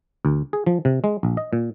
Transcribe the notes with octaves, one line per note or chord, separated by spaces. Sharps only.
D2
G#4
F3
C3
G#3
A#1
D#5
A#2